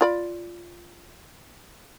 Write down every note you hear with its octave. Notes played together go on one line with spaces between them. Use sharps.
F4 D5 B5